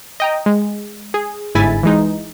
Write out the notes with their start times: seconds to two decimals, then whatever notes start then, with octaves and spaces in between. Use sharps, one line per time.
0.20 D#5 G5 A#5
0.46 G#3
1.14 G#4
1.55 G1 G#2 E4 G#5 A6 B6
1.83 E3 G#3 D#4